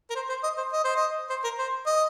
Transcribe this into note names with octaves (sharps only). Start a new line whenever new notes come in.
A#4
C5
C5
D#5
C5
D#5
C5
D#5
C5
A#4
C5
D#5